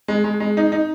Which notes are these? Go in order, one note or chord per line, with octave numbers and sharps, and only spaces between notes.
G#3
G#3
G#3
D#4
D#4